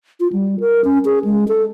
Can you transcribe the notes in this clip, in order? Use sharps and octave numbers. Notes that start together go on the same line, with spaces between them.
F4
G3
A#4
C#4
G#4
G#3
A4